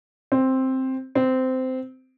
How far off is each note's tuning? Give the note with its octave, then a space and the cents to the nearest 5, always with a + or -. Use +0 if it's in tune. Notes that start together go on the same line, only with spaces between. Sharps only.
C4 +5
C4 -15